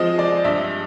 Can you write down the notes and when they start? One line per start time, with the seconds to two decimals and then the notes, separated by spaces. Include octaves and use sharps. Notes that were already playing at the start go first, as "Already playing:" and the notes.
Already playing: F3 G#3 C4 D#5
0.18 G#3 D5
0.44 G2 E5